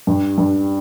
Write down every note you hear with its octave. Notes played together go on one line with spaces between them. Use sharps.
G2
G2